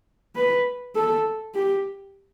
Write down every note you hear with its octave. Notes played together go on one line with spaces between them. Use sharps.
B4
A4
G4